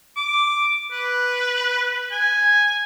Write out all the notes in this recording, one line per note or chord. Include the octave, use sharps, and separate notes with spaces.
D6
B4
G#5